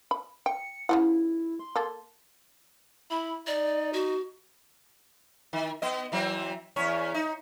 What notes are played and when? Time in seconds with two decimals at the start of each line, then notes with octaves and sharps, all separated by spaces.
0.11 B5
0.46 G5 C#7
0.89 C#3 F3 E4 F#5
1.59 C6
1.76 A#3 A4
3.11 E4 B5
3.47 D#4 D5
3.93 F#4
5.53 D#3
5.82 B3 D#5
6.12 E3 F#3 C4
6.76 E2 C#4 C#5
7.14 D#4